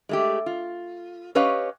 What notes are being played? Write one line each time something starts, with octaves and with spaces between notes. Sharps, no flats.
G#3 A3 G4
F4
C#4 G4 B4 C#5 D#5 F5